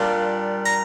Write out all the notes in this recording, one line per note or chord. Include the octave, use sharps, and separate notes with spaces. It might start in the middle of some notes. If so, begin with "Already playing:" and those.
Already playing: A#2 G3 D4 F4
A#5